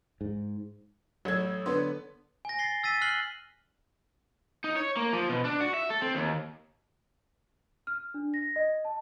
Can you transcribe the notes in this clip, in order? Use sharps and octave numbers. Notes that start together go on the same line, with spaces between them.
G#2
A1 F#3 A4 C#5 G#6
D3 B3 C6
G#5 A#6
A6 C7 G7
E6 A6 B6 D#7
F6 F#6 C7 F#7 G7
D#4
C#5
A#3
F3
B2
D4
F#4
E5
A4
C4
D#2
F6
D4
A#6
D#5
A5